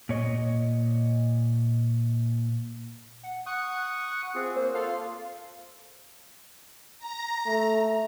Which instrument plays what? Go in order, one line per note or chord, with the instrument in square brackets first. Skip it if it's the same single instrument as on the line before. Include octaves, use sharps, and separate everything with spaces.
[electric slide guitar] A#2 C#5 D#5
[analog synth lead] F#5
[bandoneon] F#5 C#6 D#6 [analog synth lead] F#6
[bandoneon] C4 F4 G#4
[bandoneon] A#3 [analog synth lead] C5
[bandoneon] F4 A4 F6 [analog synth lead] F5
[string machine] A#5
[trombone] A3